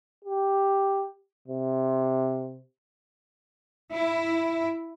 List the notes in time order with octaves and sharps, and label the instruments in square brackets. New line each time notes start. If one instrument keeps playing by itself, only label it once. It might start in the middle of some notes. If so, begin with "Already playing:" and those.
[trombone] G4
C3
[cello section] E4